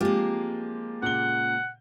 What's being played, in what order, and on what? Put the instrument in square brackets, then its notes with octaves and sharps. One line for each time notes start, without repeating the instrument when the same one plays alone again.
[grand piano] F3 C4 F4 [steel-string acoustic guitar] G#3 A#3 [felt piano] G4
[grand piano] A#2 C#3 G7 [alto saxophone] F#5